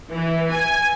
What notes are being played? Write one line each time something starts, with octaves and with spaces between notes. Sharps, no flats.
E3
G#5